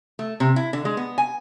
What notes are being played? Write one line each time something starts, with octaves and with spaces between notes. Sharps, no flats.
A3
C3
E4
D3
G#3
B3
G#5